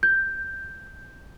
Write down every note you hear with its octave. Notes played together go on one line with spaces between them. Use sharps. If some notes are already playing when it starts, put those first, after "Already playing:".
G6